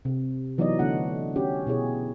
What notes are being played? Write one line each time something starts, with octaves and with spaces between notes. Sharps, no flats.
C3
E3 F#3 B3 D#4 D5 D#5
D3 A3 B3 D4 F#4 F#5
C#4 F#4 G4
B2 E4 G#4 C#5